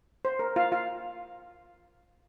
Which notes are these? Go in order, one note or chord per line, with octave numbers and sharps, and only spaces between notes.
C5
A#4
F4 F5
F4 F5